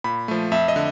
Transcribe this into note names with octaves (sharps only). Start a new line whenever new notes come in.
A#2 B5
F3 A3
F2 E5
D#5
D3